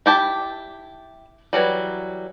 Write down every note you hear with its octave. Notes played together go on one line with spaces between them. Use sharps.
E4 G4 A5
E3 F#3 G3